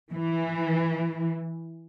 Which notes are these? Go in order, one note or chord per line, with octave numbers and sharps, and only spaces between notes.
E3